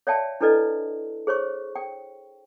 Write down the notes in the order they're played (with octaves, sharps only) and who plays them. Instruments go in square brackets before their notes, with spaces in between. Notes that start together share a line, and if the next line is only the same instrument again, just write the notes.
[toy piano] C#5 D5 E5 F5 G5 A5
D4 E4 A4 B4 D5 D#5
G#4 C5 C#5 C#6
G5